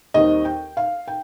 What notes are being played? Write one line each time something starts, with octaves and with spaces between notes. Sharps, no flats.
D#2 D#3 G3 C4 D#4 D#5
G5
F5
G5